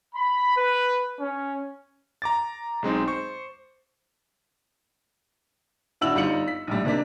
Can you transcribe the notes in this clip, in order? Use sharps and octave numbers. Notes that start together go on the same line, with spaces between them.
B5
B4
C#4
A#5 D6 A6
B1 G#3 C4 D#4
C5 C#6
D1 D4 E4 F#4 E6 F#7
G1 G3 D#4 F4 C#7 F#7
B6
A#1 A2 G3
C3 A#3 D4 B6